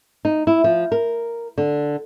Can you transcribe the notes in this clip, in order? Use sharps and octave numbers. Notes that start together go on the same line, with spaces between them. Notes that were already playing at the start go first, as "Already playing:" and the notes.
D#4
E4
F3
A#4
D3